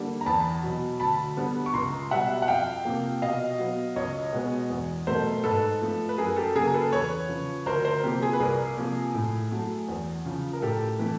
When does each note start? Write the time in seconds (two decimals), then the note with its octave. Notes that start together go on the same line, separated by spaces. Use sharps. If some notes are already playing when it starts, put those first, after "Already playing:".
Already playing: D3 G3 A#3
0.21 A#5
0.26 E2 A5 B5
0.63 B2 F#3
1.00 D2 A5 B5
1.37 D3 G3 B3
1.66 C#6
1.74 C#2 A#5 C6
2.11 B2 G3 E5 F#5
2.42 F#5
2.48 F2 F5 G5
2.85 C3 F3 A#3
3.22 B2 D#5 F5
3.59 F#3 B3
3.96 C#2 C#5 D#5
4.33 B2 G#3 B3
4.70 E2
5.07 B2 F#3 A3 A#4 C5
5.44 G#2 A4 B4
5.82 F3 A3
6.09 B4
6.18 F#2 G#4 A#4
6.36 G4 A4
6.55 C#3 F#3 A#3 G#4 A#4
6.67 A#4
6.74 A4 B4
6.92 E2 B4 C#5
7.29 C#3 F3
7.66 D2 A#4 C5
7.85 A#4 C5
8.03 C3 F3 A#3 G4
8.22 G#4
8.33 B4
8.40 C2 G#4 A#4
8.77 C3 F3 A#3
9.15 A2
9.52 F#3 A3
9.88 E2
10.25 C#3 F3
10.53 A#4
10.62 A2 G4 A4
10.99 E3 A3